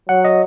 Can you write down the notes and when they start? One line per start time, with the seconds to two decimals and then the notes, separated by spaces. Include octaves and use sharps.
0.09 F#3 F#5
0.25 D#5